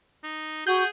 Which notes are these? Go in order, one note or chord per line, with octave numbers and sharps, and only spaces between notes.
D#4
F#4 G#4 F#5 G6